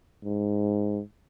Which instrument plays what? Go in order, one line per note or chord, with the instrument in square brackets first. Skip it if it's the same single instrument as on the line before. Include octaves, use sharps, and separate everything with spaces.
[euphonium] G#2